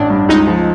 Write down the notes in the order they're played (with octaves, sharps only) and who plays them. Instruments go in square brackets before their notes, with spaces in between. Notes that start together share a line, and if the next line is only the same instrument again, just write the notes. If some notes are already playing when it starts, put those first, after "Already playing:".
Already playing: [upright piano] A1 [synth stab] D4
[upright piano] G2
[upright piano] C#2 [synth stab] D#4
[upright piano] F3